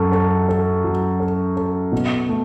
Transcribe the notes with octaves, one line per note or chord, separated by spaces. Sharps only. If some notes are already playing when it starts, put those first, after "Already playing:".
Already playing: F#2 A4
A4
A4
F#3
A4
A4
B2
A3